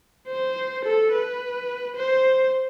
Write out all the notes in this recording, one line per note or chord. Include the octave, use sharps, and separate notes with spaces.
C5
A4
B4
C5